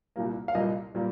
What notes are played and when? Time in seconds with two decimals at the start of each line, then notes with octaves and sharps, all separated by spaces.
0.16 C2 A#2 G3 A#3
0.48 F5
0.55 C2 A#2 G3 A#3 D#5
0.95 A#2 G3 A#3